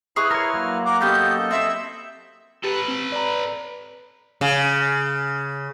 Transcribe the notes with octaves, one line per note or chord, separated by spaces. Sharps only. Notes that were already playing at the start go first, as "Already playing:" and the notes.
E4 G#4 B4 C#6 F6 F#6
A#4 C#5 C6
F#3 A#3
A#4 F#5 D6
B3 C#4 G4 A4 D#5 G6
C4 E4 E5
G4 A4 B4
C4
D5 A#5
C#3